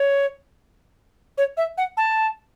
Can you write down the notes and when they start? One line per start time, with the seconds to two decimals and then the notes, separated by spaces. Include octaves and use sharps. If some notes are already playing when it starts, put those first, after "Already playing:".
Already playing: C#5
1.38 C#5
1.57 E5
1.78 F#5
1.97 A5